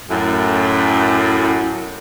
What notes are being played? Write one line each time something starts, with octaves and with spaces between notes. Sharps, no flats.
F#2 A2